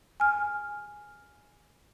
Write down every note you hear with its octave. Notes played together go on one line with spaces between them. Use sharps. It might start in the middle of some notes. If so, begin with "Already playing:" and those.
G#5 F6